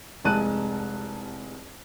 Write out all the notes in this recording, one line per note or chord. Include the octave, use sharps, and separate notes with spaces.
F1 C2 G#3 A5 F#6 D#7